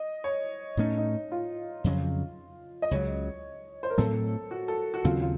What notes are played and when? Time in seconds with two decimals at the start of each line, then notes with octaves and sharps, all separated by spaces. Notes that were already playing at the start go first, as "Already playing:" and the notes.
Already playing: D#5
0.24 C#5
0.77 A2 A3 C#4 D#4
0.98 D#4
1.32 F4
1.84 F2 C#3 F#3
2.82 D#5
2.91 C#2 C#3 F#3 C#5
3.83 C5
3.90 A#4
3.98 A2 F#3 C4 A4
4.51 F#4
4.68 A4
4.94 F#4
5.04 D#2 C#3 F#3 C4 F4
5.22 F4